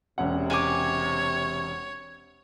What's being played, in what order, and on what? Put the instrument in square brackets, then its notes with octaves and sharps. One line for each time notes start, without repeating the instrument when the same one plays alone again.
[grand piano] E1 C#4 F#5 [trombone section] C3
[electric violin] C#5 [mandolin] G#5 D6